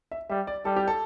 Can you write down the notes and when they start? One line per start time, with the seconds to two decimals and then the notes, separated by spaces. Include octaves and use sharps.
0.11 E5
0.30 G3 E5
0.47 D5
0.65 G3 A4
0.76 G4
0.88 A4